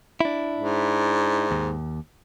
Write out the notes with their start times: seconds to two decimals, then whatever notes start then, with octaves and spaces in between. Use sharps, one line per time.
0.21 D4 E4
0.56 G#2
1.51 D#2